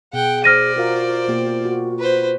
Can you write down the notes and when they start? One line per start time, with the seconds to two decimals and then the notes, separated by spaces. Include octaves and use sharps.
0.13 B2 G#4 F#5 G5
0.44 C5 D5 F6 A#6 D#7
0.76 F4 F#4 A#4 F5
1.27 B2 A#3 G4
1.65 F#4
1.99 B4 C5